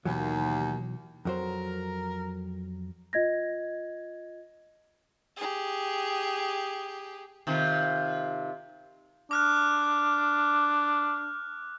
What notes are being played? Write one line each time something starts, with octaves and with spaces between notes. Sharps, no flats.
D#2 B2 E3 F#3
F2 F#3 A#4 C5
F4 D#5 G#6 A#6
G4 G#4
C3 D#3 F4
D4 D6 F6 F#6